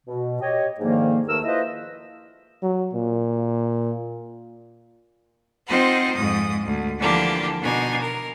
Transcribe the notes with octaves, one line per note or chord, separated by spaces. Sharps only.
B2
G4 C#5 D#5
G#2 D3 D#3 F3 A#3
D#2 A3 A#4 B4 E6
E4 F4 B4 C5 D#5
F#3
A#2
C4 D#4 F4 C5 F#5
F2 G#2 D#6
D2
D3 E3 F3 A#3 D4 G4
B2 D4 D#4 G#5
A#4